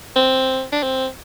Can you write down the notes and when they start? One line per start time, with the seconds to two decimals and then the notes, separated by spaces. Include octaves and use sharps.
0.16 C4
0.72 D4
0.83 C4